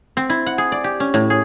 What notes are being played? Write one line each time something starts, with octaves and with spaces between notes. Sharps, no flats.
C4
E4
F#5
G#4
D5
G4
C#4
A2
G#4